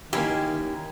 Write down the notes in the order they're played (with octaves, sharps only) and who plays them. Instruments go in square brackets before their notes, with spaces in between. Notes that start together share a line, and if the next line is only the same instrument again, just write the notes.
[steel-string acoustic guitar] D#2 [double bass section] D#3 [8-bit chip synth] A#3 G4 [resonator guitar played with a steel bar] C#4 E4